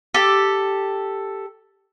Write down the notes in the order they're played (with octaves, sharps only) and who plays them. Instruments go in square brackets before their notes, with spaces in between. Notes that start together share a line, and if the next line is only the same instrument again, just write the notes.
[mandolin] G4 A4